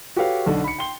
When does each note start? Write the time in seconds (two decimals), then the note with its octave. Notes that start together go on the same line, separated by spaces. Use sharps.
0.16 F#4 G4 A4 B4 C#5 F5
0.46 B1 D3
0.64 B5 C#7
0.78 G5 C6 G7